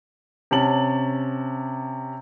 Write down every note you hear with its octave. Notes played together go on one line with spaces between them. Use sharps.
C3 C#4 A5 F#7